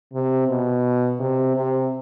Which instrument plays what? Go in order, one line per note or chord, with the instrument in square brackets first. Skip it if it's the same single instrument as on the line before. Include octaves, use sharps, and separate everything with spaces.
[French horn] C3
B2
C3
C3